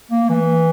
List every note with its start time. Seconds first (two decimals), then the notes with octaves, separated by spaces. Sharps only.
0.11 A#3
0.29 E3